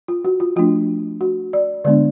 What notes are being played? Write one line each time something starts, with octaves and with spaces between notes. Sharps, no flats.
F4
F#4
F4
F3 A3 D4 F4
F#4
D5
D3 G#3 B3 D4 D5